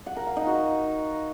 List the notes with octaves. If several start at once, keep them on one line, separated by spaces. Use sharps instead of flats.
F#5
A#4
F5
D#4
F#4